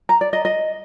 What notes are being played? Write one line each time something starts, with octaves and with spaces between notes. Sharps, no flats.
A#5
D5
D#5
D#5